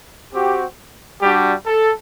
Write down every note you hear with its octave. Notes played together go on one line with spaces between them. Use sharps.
C4 F#4 G4
G3 D4 F#4 G4
A4